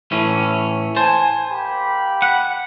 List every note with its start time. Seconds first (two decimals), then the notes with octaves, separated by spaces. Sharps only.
0.12 A2 E3 C#4
0.96 C5 G#5 A5
1.51 A#3 G4 B5
2.22 F#5